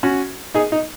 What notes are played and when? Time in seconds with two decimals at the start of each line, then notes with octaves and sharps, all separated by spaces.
0.03 C#4 F#4
0.54 D#4 G#4
0.72 D#4